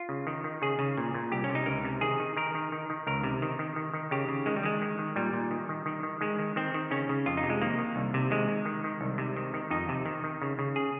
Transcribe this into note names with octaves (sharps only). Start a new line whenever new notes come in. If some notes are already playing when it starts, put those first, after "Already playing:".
Already playing: F4
C#3
D#3
D#3
C#3 G#4
C#3
A#2
A#2
C2 G4
C#4
C3
D#4
C#2 A#4
C3
D#3 G#4
D#3
D#3 A#4
D#3
D#3
D#3
C#2 A#4
C3
D#3
D#3
D#3
D#3
C#3 G4
C#3
D#3 G#3
G3
D#3 G#3
D#3
D#3
A#2 G3
A#2
D#3
D#3
D#3
D#3
D#3 G#3
D#3
D#3 C4
D#3
C#3 C#4
C#3
F2 F4
D#4
C3
G#3
D#3 A#3
D#3
C2
C3
D#3 G#3
D#3
D#3
D#3
C2
C3
D#3
D#3
F2 D#4
C3
D#3
D#3
C#3
C#3
G#4